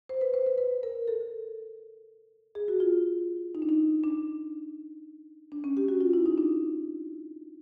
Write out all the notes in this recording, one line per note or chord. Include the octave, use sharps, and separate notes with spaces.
C5
B4
C5
B4
B4
A#4
A4
G#4
F#4
F4
D#4
D4
D#4
D4
D4
C#4
G4
F#4
F4
E4
D#4
D4